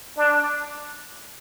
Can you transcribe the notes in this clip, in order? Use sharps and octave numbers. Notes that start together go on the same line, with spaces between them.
D4